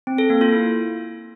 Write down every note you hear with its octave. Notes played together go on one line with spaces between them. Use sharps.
C4
A4
A#3
F4
E4